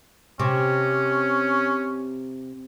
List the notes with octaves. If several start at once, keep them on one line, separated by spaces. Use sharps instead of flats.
C3 C#4